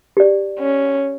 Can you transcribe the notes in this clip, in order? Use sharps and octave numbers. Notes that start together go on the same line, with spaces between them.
G4 D5
C#4